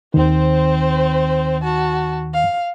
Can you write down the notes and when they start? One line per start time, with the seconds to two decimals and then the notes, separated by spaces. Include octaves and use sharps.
0.14 D#2 D#3 C4 C5
1.63 F#4 A5
2.34 F5